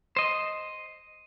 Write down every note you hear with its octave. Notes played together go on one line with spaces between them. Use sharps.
C5 D#5